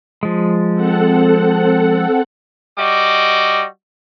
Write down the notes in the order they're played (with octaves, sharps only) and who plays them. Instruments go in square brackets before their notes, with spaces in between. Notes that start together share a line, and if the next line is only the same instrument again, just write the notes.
[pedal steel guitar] F3 G#3
[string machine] C4 A4 F#5
[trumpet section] G3 F#4 D#5 D6